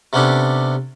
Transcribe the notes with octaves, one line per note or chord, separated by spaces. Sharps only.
C3 B3 C#4 D4 G4 A4